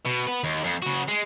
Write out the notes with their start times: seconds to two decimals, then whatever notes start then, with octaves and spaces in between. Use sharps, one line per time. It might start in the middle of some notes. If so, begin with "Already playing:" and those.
0.05 B2
0.27 B3 B4
0.44 D#2
0.64 F2
0.82 C#3 F#4
1.08 G#3